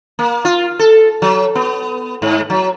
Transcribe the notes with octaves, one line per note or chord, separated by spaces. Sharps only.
A#3
F4
A4
F#3
B3
G#2
F#3